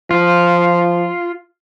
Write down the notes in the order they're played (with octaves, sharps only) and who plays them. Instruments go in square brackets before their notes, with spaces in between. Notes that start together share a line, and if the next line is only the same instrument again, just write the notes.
[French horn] F3 [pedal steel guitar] F4